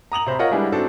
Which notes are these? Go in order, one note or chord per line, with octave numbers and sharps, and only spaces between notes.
A#5 D#6 F7 F#7
C3 C5 A#5 B5
F4 A#4 C#5 D#5 F#5
G3 G#3 D4 E4 B4
C4 D4 D#4 F#4 A4